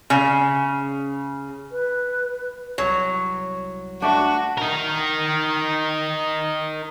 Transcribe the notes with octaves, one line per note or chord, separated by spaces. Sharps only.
C#3
B4
C2 F#3
A3 D4 F#4
D#4 A#4